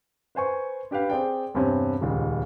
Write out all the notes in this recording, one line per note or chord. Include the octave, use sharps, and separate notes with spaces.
B4 C5 G#5 C#6
D4 G4 B4 F5 G5
C4 G#4 D5 G5
E2 G2 C3 C4 C#4
D#1 C#2 G#3